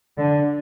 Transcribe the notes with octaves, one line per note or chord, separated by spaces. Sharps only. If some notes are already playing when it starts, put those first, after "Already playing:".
D3